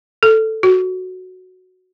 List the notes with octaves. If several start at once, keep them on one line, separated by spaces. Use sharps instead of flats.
A4
F#4